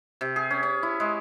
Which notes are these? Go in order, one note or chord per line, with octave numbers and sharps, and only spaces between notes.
C3
G#4
C#4
C#4
E4
G#3